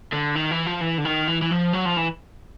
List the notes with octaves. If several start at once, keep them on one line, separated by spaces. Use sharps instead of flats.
D3
D#3
E3
F3
E3
D3
D#3
E3
E3
F3
F#3
F3
E3